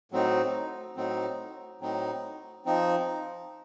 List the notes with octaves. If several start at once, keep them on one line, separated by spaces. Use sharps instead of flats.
A2 F#3 C4 D#4
A2 F#3 C4 D#4
A2 F#3 C4 D#4
F3 C4 D#4